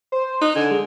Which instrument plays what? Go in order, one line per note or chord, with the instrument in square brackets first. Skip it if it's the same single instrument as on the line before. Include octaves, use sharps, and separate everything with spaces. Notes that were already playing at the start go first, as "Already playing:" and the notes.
[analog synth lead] C5
[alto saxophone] D#4 [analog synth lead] F#6
[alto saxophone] D3 [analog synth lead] G#5
[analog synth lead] G#3